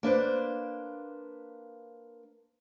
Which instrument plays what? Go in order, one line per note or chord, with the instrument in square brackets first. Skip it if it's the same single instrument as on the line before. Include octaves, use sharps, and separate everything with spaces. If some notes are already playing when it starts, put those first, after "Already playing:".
[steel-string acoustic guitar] A#3 D4 B4 C5